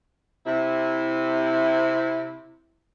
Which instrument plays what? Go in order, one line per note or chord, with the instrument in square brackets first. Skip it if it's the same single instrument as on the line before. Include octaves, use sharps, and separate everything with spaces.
[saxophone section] C3 E4